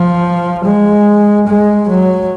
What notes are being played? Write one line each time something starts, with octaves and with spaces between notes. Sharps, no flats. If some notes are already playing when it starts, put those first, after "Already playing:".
Already playing: F3
G#3
G#3
F#3